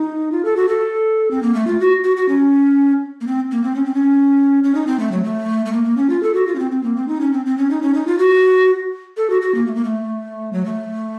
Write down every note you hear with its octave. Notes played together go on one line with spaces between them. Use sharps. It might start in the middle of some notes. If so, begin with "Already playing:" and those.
Already playing: D#4
F4
A4
F#4
A4
C4
A#3
A3
F4
F#4
F#4
F#4
C#4
A#3
C4
A#3
C4
C#4
C4
C#4
C#4
D#4
C4
A3
F#3
A3
A3
A#3
A#3
C#4
F4
A4
F#4
F4
C#4
C4
C4
A#3
C4
D#4
C#4
C4
C4
C#4
D#4
C#4
D#4
F4
F#4
A4
F#4
F#4
A#3
A3
A#3
A3
F#3
A3